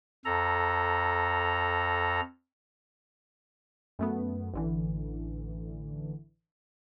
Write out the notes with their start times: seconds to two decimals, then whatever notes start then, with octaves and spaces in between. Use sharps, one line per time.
0.25 F2 A4 A#5
3.99 F#2 A3 B3
4.54 A1 D3 E3